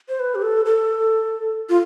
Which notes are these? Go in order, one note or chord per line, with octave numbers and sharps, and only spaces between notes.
C5
B4
G4
A4
A4
F4